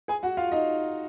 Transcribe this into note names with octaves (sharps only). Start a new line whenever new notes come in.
G#4 G#5
F#4 F#5
F4 F5
D#4 D#5